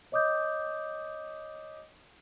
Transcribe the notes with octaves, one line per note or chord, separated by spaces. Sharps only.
C#5 D#5 D6 D#6 G6